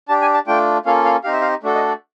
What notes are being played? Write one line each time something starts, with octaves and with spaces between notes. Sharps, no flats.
D4 G4 A5
G#5
A5
A3 D4 F4 G5
A#3 C#4 F4 A4 F5
F5
C4 D#4 G4 F5
E5
F5
A3 D4 F#4 A4
D#5
D5